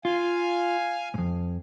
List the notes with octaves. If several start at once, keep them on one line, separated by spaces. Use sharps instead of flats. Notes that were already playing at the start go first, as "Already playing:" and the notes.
F4 F5 G#5
F2 G#2